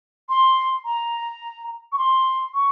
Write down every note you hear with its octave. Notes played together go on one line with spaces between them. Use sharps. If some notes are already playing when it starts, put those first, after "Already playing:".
C6
A#5
C#6
C6
C#6